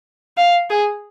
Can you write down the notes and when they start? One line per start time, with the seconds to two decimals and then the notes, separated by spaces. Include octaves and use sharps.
0.38 F5
0.70 G#4